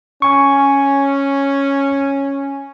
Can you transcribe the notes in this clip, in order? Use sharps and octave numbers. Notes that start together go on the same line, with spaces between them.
C#4 G#5 C#6